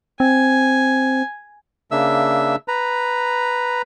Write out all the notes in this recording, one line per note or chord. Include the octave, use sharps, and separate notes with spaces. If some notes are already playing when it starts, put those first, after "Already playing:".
C4 G#5
C#3 A#3 D4 E5 E6
B4 A#5